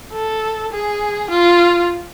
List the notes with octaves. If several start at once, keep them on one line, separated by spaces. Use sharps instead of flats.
A4
G#4
F4